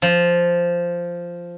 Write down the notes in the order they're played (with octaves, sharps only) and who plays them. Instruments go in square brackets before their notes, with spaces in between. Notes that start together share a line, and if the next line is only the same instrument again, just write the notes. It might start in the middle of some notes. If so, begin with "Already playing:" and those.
[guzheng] F3